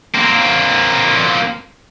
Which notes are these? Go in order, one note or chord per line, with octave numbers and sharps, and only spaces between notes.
A#3 C4